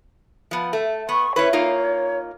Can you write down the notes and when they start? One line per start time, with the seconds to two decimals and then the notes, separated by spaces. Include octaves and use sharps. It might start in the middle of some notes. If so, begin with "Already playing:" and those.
0.51 F3 B3
0.73 A3
1.09 B3 C#6
1.36 C#4 E4 B4 C#5
1.53 A#3 D#4 F4